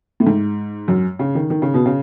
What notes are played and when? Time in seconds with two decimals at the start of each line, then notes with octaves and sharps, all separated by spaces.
0.20 A2
0.27 G#2
0.88 F#2
1.19 C#3
1.35 D#3
1.50 D#3
1.62 C#3
1.74 B2
1.86 C#3